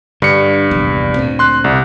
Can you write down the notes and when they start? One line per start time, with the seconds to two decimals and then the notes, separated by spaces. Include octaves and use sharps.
0.22 G2 D3 C#7
0.71 F1 A#1 E2
1.16 D2 A#2 C4
1.39 C6 F#6
1.64 C2